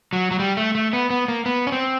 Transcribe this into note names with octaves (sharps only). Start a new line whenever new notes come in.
F#3
F#3
G3
A3
A3
B3
B3
A#3
B3
C#4
C4